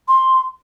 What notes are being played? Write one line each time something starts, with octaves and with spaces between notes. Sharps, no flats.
C6